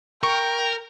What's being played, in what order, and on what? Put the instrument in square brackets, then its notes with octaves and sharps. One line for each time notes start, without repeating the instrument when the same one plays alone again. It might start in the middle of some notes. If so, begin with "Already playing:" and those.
[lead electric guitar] A#4 [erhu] G5 [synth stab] C#6